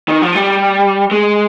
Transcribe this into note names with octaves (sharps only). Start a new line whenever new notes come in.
D#3
F3
G3
G#3